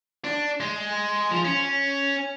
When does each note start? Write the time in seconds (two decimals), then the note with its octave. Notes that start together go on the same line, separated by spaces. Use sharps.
0.24 D4
0.60 G#3
1.31 F3
1.45 C#4